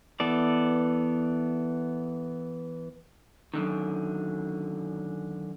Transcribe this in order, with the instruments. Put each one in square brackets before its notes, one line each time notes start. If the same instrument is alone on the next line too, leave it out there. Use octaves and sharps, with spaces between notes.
[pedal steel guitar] E3 B3 A4 D5
[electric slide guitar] F#2 D3 D#3